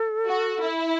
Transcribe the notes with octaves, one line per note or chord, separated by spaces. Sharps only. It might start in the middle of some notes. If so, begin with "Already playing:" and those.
Already playing: A4
F#4
E4